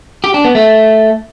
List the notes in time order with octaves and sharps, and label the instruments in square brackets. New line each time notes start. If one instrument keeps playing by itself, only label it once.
[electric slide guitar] G4
D4
B3
A3